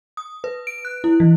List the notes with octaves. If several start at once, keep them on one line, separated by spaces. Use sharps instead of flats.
D#6
B4
D7
F#6
E4
E3